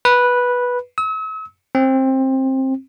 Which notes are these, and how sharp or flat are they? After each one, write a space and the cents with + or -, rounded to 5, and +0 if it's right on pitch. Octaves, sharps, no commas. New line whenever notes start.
B4 -10
E6 -45
C4 +20